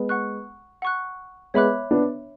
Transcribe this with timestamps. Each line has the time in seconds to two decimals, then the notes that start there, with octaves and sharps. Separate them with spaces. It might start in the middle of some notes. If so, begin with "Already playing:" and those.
Already playing: G#3 B3
0.09 F#5 C#6 F#6
0.82 F#5 C#6 F#6
1.54 G#3 B3 C#5 E5 B5 D6 F#6
1.91 B3 D4